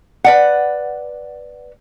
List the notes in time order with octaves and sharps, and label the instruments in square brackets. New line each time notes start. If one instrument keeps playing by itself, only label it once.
[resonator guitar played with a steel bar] B4 D5 F#5